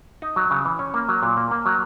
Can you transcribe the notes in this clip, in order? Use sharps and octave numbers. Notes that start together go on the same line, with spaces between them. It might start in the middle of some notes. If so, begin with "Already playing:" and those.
D#4
F#3
C#3
E3
C#4
A#3
F#3
A#2
A#3
A#3
F#3